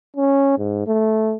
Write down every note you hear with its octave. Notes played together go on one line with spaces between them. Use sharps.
C#4
G#2
A3